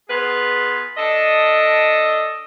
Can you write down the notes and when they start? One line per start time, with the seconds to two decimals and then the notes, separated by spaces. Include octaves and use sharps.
0.09 B3 F4 G#4 B4
0.97 D4 A4 D#5